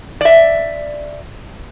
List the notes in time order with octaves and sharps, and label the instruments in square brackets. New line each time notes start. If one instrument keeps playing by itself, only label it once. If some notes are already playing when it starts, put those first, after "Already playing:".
[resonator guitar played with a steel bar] D5 E5